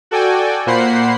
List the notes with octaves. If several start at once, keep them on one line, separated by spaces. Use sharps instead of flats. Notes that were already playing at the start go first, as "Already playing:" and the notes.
F#4 A4 D5 G5 G#5
A#2 A#3 C5 F#5 B5 C7